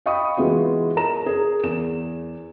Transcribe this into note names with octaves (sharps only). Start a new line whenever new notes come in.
D#5 F5 G5 B5 C#6 D#6
E3 G#3 B3 F4 F#4
A#4 A#5 E7
G#4 A#4
E2 E7